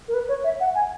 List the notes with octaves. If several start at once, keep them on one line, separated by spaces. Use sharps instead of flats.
A#4
B4
C#5
E5
F#5
G#5